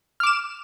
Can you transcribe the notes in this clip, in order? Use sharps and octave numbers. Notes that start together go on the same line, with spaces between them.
D6 F6 E7